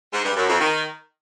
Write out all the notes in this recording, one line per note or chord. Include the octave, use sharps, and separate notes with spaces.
G#2
G2
F#2
F2
D#3